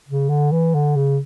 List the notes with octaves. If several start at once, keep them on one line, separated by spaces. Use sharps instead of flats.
C#3
D3
E3
D3
C#3